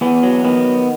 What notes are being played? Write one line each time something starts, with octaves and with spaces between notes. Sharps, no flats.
E2 B3
F#3
D#3 B3